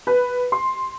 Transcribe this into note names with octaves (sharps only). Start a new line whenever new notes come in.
B4
C6